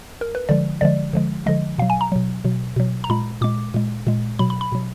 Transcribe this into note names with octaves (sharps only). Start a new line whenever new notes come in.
A#4
B4
D3 F3 G#3 D5
D3 F3 G#3 D5
D3 F3 G#3
D3 F3 G#3 D#5
B2 F#3 F5
G#5
A#5
B2 F#3
B2 F#3
B2 F#3
A#5
A#2 G#3 B5
A#2 G#3 D6
A#2 G#3
A#2 G#3
B2 F#3 B5
B5
B5
B2 F#3